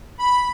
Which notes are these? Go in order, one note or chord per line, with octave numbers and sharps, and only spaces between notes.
B5